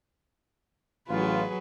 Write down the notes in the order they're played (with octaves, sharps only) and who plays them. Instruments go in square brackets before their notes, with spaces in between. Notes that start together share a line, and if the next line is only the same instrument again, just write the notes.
[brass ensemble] A1 F4 [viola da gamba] F#3 G#4 B4